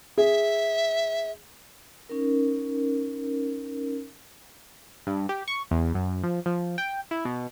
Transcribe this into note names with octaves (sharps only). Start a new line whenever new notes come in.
G#4 E5
C#4 D#4 A#4
G2
G4
C#6
E2
F#2
F3
F3
G5
E4
B2